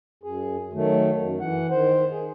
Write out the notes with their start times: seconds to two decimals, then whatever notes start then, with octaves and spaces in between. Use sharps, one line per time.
0.23 F#2 G#4
0.73 D#3 F#3 A3
1.21 F#2
1.40 E3 F#5
1.70 D#3 C5
2.11 G#4